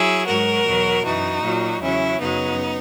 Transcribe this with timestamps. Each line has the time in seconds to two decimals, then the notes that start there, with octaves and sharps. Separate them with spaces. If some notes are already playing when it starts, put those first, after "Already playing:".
Already playing: F#3 E4 G#4
0.26 G#2 F#3 F#4 A#4
0.65 E2 B2 F#3
1.04 F#2 E3 D#4 F#4
1.43 A#2 F#3
1.81 E2 C#3 F#3 C#4 E4
2.19 F#2 C#3 F#3 B3 D#4